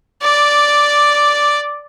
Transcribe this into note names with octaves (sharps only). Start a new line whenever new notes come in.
D5 D6